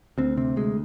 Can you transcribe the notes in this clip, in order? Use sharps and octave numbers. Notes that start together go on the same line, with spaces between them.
D2 C4
C3 C4
D2 G#3